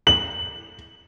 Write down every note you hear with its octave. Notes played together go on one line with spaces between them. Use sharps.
F#7